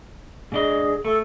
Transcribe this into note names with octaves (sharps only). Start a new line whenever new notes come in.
G#2 D4 G#4 D#5
A3 A4